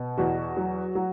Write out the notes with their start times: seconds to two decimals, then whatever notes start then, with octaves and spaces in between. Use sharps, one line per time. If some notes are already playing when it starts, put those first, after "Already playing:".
Already playing: B2
0.18 E2 F#4
0.57 F#3
0.95 F#3